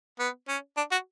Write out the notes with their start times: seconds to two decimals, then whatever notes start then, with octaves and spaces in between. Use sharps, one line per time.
0.19 B3
0.48 C#4
0.77 D4
0.92 F#4